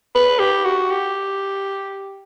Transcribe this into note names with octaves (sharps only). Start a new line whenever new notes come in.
B4
G4
F#4
G4